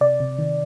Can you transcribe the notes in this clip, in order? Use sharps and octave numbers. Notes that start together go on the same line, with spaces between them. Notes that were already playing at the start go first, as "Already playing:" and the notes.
C3 D5
C3
D#3